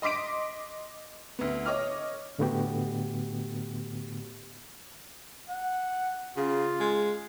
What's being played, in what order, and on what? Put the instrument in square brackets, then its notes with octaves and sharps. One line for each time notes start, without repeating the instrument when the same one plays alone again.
[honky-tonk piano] D#5 C6 D6 B6 D7
D2 B3
C#5 D#5 D6 F6
[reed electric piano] A2 D3 A3 B3 F#4 G4
[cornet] F#5
[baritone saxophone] C#3 [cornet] F4
[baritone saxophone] G#3